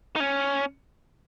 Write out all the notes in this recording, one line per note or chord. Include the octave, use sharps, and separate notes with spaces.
D#4
C#4